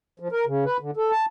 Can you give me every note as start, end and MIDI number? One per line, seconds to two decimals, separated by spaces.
0.20 0.28 53
0.32 0.45 70
0.47 0.65 49
0.65 0.77 71
0.80 0.91 50
0.97 1.11 69
1.11 1.26 81